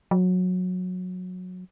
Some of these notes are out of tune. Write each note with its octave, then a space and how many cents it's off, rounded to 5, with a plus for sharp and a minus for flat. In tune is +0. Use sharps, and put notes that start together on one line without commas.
F#3 -20